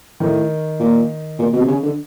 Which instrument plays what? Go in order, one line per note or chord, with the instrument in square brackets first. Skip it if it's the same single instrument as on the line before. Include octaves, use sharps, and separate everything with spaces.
[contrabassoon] A2 [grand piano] D#3
[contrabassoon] A#2
A#2
B2
C3
C#3
D3